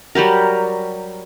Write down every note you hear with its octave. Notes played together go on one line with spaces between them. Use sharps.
F#3 G3 G4 A#4